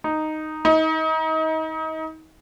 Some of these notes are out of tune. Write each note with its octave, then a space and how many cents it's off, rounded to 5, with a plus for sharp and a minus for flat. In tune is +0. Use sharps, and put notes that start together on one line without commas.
D#4 -5
D#4 +30